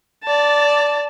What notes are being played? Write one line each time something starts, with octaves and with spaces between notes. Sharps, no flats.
D5 A5